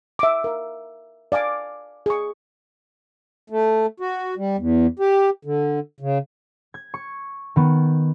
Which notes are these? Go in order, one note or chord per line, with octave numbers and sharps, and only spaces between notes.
E5 D6
A#4 F5
D5 F5 G#5 D6
G#4 C#6
A3
F#4
G3
E2
G4
D3
C#3
G#6
C#6
D#3 B3